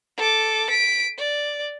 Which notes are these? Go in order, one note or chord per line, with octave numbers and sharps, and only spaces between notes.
A4 D6
B6 D7
D5